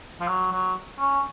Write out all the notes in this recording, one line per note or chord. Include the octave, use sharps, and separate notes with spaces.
F3
F#3
F#3
C#4